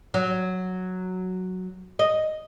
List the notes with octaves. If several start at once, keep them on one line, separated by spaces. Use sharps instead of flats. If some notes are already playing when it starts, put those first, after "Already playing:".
F#3
D#5